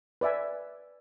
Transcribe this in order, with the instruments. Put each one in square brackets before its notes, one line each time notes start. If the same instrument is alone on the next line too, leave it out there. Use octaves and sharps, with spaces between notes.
[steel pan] B4 D5 E5 G#5